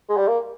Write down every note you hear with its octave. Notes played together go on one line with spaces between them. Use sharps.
G#3
G3
A#3